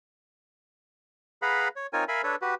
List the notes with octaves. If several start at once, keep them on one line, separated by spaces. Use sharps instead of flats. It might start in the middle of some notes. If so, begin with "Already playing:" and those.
G#4 B4 F5 F#5 A#5 B5
C#5
C4 D#4 F4 A#4 C#5 G#5
A#4 E5 F5 G#5 B5
D4 A4 B4 C#5
F#4 G4 B4